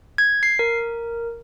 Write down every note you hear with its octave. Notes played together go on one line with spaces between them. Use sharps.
G#6
C7
A#4